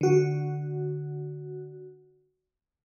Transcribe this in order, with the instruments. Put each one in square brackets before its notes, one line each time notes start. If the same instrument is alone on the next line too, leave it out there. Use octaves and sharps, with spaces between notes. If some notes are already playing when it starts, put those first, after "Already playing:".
[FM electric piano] D3 F#4